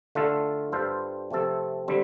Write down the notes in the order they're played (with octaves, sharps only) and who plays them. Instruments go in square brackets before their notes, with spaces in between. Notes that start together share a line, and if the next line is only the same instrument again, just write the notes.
[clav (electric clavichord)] D3 A3 F4 A4
G2 G3 F4 A4 C5
C3 F3 A3 C4 A4
D3 G3 C4